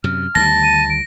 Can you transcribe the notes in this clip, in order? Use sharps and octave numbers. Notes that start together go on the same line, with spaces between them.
F#2 C3 F6
D2 D#3 G3 A5 A#6
D#7
D7